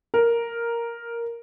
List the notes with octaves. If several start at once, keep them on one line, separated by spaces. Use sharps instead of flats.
A#4